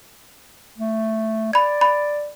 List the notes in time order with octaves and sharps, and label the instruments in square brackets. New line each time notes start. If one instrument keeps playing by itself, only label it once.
[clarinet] A3
[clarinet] D5 [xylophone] B5 G#6
[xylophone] B5